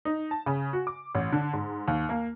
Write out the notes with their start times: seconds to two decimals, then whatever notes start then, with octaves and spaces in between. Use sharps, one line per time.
0.05 D#4
0.31 A5
0.46 C#3
0.73 F#4
0.87 D6
1.15 A1
1.32 D3
1.53 G#2
1.88 D#2
2.09 A#3